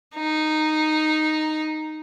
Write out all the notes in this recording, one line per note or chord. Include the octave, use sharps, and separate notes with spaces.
D#4